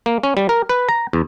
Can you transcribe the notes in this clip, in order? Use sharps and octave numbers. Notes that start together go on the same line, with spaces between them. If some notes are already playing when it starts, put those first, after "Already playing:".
A#3
C#4
G3
A#4
B4
A#5
E2